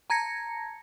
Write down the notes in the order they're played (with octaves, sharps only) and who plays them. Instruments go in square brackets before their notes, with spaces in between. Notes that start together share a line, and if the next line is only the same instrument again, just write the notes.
[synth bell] A5 A#5 G#6 A#6 C#7